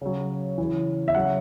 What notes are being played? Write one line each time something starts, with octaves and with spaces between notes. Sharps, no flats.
C#3 F#3
C#3 E3
E5
C#3 F#3 F#5